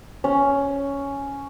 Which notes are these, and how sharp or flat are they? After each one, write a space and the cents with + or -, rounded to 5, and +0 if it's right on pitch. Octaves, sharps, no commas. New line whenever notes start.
C#4 +5